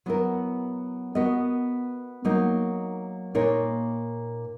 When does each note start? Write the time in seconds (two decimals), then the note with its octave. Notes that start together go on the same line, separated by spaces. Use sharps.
0.06 F#3 B3 E4 A#4
1.15 B3 F#4 A#4 D#5
2.25 F#3 A#3 D#4 A#4
3.35 A#2 A#3 D#4 A#4 C#5